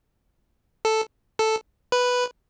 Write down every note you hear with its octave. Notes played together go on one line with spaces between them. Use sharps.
A4
A4
B4